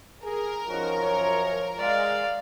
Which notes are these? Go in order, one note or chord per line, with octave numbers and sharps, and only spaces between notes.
G#4 A#4
F3 C#4 D#4 F#4
F#2 C#5
G#3 D5 F5